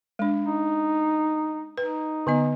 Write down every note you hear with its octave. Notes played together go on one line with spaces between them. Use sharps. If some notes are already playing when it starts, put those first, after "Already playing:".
G#3 D4
D#4
D#4 B4
D3 B3 D#5